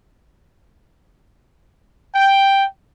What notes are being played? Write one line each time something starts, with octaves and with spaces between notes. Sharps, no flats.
G5